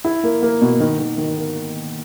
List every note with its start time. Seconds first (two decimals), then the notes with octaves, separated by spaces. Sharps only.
0.04 E4
0.24 A#3
0.42 A#3
0.62 B2
0.80 D#3
0.99 D#3
1.18 D#3
1.37 A#3